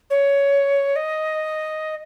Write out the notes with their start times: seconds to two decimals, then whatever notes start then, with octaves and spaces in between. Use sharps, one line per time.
0.10 C#5
0.96 D#5